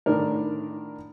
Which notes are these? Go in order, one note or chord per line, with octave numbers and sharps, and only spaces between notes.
A2 D3 D#3 D4 A#4